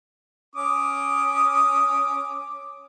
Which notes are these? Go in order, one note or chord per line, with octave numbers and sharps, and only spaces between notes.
C#4 D6 D#6